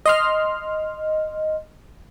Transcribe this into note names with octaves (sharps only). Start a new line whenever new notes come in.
D#5 C6 F6